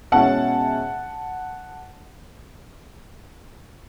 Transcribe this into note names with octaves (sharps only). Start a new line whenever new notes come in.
B2 G#3 C#4 E4 F#5 A5